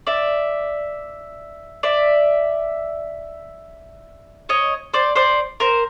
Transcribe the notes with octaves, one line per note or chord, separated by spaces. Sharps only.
D5 E5
D5 E5
C#5 D#5
C5 D5
C5 D5
A#4 C5